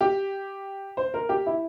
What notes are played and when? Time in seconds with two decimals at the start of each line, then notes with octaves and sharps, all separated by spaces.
0.01 G4
0.97 C5
1.14 A#4
1.29 G4
1.46 E4